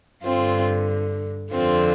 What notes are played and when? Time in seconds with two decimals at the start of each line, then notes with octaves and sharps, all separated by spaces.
0.24 G2 D3 C4 F4
1.53 F2 D3 C4 F4